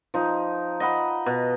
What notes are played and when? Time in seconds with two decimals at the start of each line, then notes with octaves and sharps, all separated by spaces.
0.14 F3 D#4
0.80 D#5 F#5 B5
1.26 B2